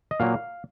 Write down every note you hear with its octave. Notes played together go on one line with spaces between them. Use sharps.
D#5
A#2 F#3 A#3 F5